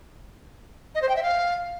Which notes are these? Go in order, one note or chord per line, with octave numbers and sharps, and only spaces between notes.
D#5
C5
G5
E5
F5